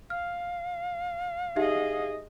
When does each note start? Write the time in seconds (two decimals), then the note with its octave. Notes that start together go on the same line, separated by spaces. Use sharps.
0.10 F5 F6
1.56 D#4 G4 G#4 D#5 E5